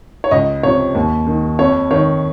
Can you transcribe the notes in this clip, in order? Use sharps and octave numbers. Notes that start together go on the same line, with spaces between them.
C#5
C#2 D#5
C3 F3 C#5
D#2
D#3
F2 C#5
D#3 C#5